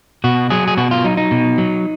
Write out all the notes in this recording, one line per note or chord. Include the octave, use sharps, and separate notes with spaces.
B2 F#4
F#3 G#4
G#4
B2 F#4
F4
F#3 D#4
D#4
B2
F#3